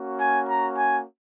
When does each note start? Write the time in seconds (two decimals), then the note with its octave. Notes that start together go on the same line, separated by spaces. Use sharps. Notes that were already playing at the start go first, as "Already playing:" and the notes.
Already playing: A#3 C#4 F#4
0.20 G#5
0.48 A#5
0.77 G#5